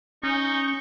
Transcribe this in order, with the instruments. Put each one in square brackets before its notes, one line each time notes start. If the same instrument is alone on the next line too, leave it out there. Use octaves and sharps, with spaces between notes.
[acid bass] C#4 [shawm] D#4 [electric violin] C#6 G6